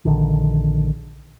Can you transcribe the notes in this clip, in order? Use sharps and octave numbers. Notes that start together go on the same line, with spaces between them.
A#1 D3 D#3